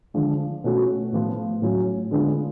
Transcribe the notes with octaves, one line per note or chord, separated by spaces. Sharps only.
D3 F3 G#3
B2 A3 C#4 F#4
A2 F3 B3 F4
A2 F#3 C#4
D3 G#3 B3 D4 F4